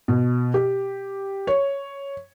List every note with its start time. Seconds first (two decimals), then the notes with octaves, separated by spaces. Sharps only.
0.08 B2
0.54 G4
1.47 C#5